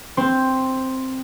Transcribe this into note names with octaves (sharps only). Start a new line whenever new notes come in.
C4 C5